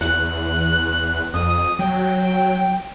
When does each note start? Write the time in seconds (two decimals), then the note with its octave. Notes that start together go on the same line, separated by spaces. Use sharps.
0.01 E2 F#6
1.34 F2 D#6
1.79 F#3 G5